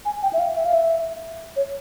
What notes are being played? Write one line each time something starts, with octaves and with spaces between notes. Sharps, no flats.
G#5
G5
E5
F5
E5
F5
E5
C#5